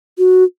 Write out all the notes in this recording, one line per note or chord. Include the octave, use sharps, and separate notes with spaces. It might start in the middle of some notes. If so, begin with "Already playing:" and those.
F#4